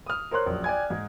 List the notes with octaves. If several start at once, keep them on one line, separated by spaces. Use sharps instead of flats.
D#6 F6
A#4 C5 C#5 C6 F#6
A#1 F#2
D5 G5 G#5 G#6
G#2 G#3